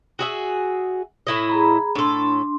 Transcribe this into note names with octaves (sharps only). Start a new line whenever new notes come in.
F#4 G#4 E5
A2 E4 D#5
G#4 A#5 B5
A2 D4 A4 C6